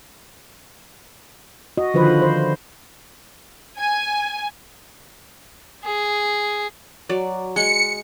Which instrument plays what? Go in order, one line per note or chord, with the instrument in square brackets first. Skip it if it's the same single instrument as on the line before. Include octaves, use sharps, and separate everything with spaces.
[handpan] F#4 D#5
D3 D#3 F3 B4 C5
C5
[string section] G#5
[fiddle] G#4
[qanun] F#3 D5
[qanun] G#3 [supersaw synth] C#7